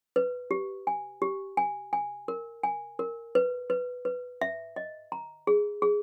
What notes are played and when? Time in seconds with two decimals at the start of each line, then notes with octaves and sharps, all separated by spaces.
0.16 B4
0.51 G4
0.87 G#5
1.22 G4
1.57 G#5
1.93 G#5
2.28 A#4
2.63 G#5
2.99 A#4
3.35 B4
3.70 B4
4.05 B4
4.42 E5
4.76 D#5
5.12 A#5
5.47 G#4
5.82 G#4